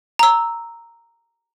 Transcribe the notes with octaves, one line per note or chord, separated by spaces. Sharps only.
A#5 E6